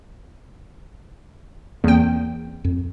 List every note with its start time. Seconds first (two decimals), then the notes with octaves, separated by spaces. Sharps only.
1.84 E2 A#3 C4 G5
2.64 F2